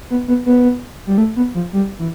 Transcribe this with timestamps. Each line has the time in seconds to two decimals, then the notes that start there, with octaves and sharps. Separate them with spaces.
0.10 B3
0.28 B3
0.46 B3
1.07 G3
1.18 A3
1.36 B3
1.54 F3
1.73 G3
1.99 E3